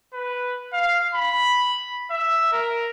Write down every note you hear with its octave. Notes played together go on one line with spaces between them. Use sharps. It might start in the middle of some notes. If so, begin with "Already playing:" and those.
B4
F5
B5
E5
A#4